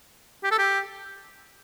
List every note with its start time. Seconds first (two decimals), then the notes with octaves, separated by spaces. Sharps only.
0.44 G4
0.51 A4
0.59 G4